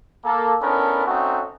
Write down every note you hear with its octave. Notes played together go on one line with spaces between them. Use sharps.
A#3 A4
B3 C#4 D4 E4 A4 A#4
A3 C4 C#4 D#4 F#4